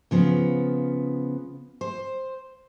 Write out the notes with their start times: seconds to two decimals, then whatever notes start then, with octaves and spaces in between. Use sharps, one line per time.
0.11 C#3 F3 B3
1.81 C5